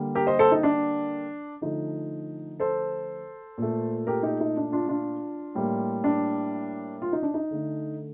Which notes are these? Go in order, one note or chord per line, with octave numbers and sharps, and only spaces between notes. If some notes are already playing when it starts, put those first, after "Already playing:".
Already playing: D3 G3 A#3
G4 A#4
C5 D#5
A4 C5
D#4
D4
D3 F3 A3 D#4
A4 C5
A#2 A3
G4 A#4
D#4 G4
D#4
D4
D4 F4
D4 F4
A2 G3 A#3
D4
F4
D#4
D4
D#4
D3 A3